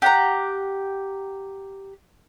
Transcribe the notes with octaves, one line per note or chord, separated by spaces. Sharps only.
G4 F#5 A#5